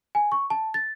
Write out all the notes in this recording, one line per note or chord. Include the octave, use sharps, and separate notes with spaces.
G#5
C#6
A5
A6